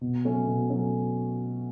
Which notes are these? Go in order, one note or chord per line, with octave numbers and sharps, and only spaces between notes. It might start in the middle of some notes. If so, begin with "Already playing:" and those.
B2
F#3 A3 C#4
B2
F#3 A3 C#4